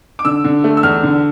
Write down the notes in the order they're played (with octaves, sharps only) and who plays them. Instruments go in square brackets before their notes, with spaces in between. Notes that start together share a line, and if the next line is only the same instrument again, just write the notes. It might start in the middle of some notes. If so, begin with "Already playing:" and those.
[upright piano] D6
D3 E6
D3
A3
E6
E2 F6
D3